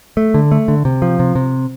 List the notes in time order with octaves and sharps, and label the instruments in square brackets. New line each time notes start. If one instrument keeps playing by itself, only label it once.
[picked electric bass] A3
D3
A3
D3
C3
F3
C3
C3